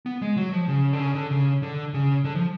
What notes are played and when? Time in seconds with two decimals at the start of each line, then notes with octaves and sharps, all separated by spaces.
0.06 B3
0.22 G#3
0.37 F#3
0.53 F3
0.68 C#3
0.93 D3
0.99 C#3
1.15 D3
1.31 C#3
1.62 D3
1.94 C#3
2.24 D3
2.35 F3